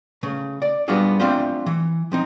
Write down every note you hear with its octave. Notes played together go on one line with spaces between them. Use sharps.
C#3 A3
D5
G3 B3 D4 F4 F#4 G#4
A3 C4 D4 F4 G4 C5
E3
F3 C4 D#4